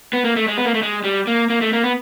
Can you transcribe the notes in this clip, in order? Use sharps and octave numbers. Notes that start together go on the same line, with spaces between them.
B3
A#3
A3
G#3
B3
A#3
A3
G#3
G3
A#3
A#3
A3
A#3
B3